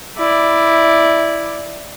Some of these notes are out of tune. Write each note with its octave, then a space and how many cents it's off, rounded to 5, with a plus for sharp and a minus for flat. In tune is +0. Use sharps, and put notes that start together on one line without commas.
E4 +0 D5 +0